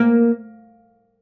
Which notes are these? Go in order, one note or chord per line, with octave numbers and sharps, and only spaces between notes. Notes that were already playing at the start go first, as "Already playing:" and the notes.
Already playing: A#3